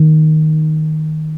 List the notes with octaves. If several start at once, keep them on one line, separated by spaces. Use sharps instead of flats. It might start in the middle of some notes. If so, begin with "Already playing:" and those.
Already playing: D#3